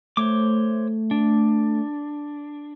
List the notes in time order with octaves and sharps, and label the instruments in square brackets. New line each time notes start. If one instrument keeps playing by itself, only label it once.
[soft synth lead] A3 [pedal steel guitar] C5 C#5 D6
[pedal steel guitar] D4